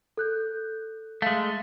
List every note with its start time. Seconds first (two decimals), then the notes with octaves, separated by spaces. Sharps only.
0.17 A4 F#6 G6
1.22 G#3 A3 F5